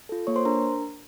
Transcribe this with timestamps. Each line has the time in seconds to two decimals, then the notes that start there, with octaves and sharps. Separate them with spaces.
0.09 F4 A4
0.27 A#3 C#5 C#6
0.36 C5 C6
0.45 D4 A#4 A#5